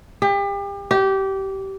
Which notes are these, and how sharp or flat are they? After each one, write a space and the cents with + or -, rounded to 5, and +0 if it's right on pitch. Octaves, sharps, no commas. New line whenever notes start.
G4 +35
G4 -20